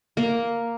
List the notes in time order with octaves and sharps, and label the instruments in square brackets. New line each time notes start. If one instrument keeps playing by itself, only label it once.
[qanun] A#3